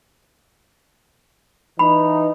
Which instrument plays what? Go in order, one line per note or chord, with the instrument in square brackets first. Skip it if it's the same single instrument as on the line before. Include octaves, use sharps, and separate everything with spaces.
[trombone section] E3 D#4 [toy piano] B5